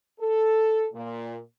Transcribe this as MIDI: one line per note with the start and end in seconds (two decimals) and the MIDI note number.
0.18 0.86 69
0.94 1.38 46